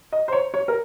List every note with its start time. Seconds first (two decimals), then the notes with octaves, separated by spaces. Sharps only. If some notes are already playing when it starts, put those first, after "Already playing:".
0.12 D#5
0.28 C5
0.32 C#5
0.54 C#5
0.68 A#4